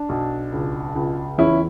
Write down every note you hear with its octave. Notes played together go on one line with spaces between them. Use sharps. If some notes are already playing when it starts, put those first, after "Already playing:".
Already playing: D4
B1
C#2
C#2
E2 C#4 E4